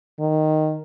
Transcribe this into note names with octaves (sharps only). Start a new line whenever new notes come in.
D#3